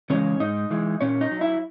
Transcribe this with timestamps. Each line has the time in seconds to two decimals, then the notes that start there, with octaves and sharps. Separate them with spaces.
0.10 C#3 E3 G#3 C#4 C#5
0.40 G#2 D#4 D#5
0.70 E3 G#3
1.01 A#2 C#4 C#5
1.21 D#4 D#5
1.31 F#3
1.41 E4 E5